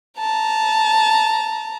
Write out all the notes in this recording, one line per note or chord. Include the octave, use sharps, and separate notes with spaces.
A5 A#5